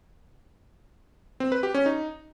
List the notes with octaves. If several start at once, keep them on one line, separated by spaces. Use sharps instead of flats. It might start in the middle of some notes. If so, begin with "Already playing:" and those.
C4
B4
G4
C#4
D#4